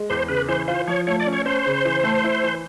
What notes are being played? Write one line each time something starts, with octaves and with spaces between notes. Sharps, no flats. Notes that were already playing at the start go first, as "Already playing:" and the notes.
Already playing: G#3
E2 C5
C#3 B4
E3 C5
F4 C5
F3 C#5
A3 C#5
D5
C#4
C#5
C#4 C5
C#3
E3
A3
E4
E3